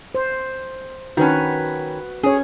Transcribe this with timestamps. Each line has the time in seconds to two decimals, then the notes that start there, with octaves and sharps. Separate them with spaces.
0.15 C5
1.17 D#3 C#4 F#4 B4
2.23 C#4 G#4 C#5